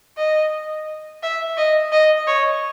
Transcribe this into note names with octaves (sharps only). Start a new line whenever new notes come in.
D#5
E5
D#5
D#5
C#5